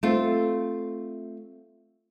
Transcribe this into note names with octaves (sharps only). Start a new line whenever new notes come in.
A3 C4 F4